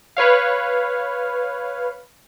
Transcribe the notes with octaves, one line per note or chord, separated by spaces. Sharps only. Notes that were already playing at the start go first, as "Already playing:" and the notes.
B4 C#5 F5